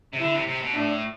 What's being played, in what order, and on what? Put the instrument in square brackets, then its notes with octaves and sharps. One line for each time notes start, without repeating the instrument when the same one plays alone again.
[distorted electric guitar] C3
[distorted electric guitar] D3 [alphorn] E4
[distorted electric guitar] C3
C3
B2
[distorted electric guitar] A2 [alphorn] D4